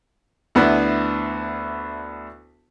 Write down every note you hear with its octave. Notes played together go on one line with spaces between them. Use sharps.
D2 B3 D4 E4 B4